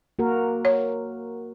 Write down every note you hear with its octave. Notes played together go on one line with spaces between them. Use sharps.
A#3 F#4 A#4
C#5